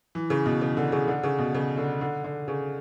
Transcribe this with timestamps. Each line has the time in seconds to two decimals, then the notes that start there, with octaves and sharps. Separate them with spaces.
0.15 E3
0.30 C#3
0.46 B2
0.61 C#3
0.77 D3
0.92 C#3
1.08 D3
1.23 C#3
1.38 B2
1.55 C#3
1.77 D3
2.01 D3
2.24 D3
2.48 C#3